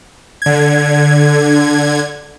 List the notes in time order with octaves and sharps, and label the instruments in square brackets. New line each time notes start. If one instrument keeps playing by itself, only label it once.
[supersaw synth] D3 G#6